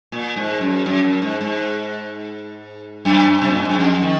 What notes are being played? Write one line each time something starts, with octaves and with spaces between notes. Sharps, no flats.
A#2
G#2
F#2
F#2
F#2
G#2
G#2
F#2
C3
A#2
G#2
F#2
F2
D#3